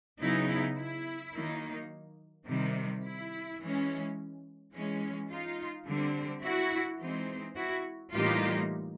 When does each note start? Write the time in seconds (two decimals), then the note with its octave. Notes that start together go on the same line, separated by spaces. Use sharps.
0.20 C#3 F#3 B3 D#4 E4
0.48 E4
0.77 E4
1.33 D#3 F#3 A#3 D#4
2.47 C3 D#3 G3
3.03 E4
3.60 E3 G#3 C#4
4.73 E3 G#3 C#4
5.30 D#4 F4
5.86 D3 G3 C4
6.42 E4 F#4
6.99 E3 G#3 C4 D#4
7.56 E4 F#4
8.13 A2 E3 G3 A#3 D#4 F4 G4